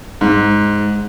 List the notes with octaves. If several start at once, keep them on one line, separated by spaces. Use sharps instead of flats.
G#2